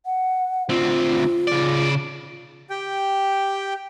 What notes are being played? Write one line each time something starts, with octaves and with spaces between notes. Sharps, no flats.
F#5
D2 C4 F4
C#3 D5
G4 G5